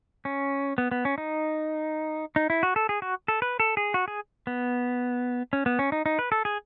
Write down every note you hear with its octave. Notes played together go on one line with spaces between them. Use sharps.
C#4
B3
B3
C#4
D#4
D#4
E4
F#4
A4
G#4
F#4
A4
B4
A4
G#4
F#4
G#4
B3
C#4
B3
C#4
D#4
D#4
B4
A4
G#4